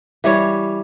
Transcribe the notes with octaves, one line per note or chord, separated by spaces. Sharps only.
E3 G3 C#5